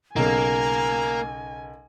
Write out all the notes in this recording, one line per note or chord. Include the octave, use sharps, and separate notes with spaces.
B1 C#3 A#3 A#4 G#5 A#5